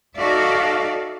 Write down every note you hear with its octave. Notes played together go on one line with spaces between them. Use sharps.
D#4 F#4 A4 D5 E5 F5